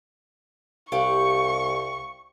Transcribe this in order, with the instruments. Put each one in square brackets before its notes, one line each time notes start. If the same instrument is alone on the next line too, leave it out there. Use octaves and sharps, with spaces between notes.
[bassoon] C2 [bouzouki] G4 F5 F#5 [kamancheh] C#6